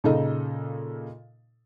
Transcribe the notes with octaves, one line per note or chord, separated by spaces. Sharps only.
A#2 C#3 D#4 A4 D#5